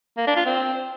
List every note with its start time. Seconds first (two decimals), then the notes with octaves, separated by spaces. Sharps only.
0.18 A#3
0.27 D4
0.36 F4
0.46 C4